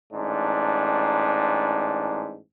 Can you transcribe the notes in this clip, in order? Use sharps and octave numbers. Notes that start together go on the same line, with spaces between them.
A1 G#2 D4